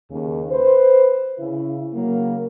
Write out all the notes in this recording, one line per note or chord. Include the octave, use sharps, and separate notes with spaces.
D#2 C#3
B4 C5
C#3 E4
C#3 F#3 A#3